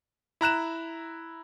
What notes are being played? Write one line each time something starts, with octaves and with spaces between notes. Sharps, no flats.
E4 A#5 F#6 E7